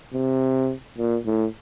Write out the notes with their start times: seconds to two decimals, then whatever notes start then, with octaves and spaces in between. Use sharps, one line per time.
0.14 C3
0.98 A#2
1.26 A2